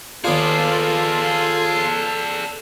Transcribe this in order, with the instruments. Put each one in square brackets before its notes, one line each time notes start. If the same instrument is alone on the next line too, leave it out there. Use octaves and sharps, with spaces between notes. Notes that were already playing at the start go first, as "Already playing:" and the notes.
[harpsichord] D#2 B3 D4 [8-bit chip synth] F4 [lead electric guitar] G#4 D5 [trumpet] A4